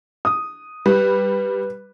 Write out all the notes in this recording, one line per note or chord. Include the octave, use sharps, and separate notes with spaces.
D#6
G3 B4